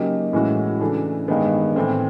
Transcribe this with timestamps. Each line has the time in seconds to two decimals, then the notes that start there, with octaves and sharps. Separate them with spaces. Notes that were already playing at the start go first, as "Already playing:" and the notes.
Already playing: C#3 F#3 A#3 D#4 G4
0.33 A2 E3 G#3 C#4 F#4
0.81 C#3 E3 A3 D4
1.28 G2 D#3 G#3 B3
1.76 A2 E3 A3 C4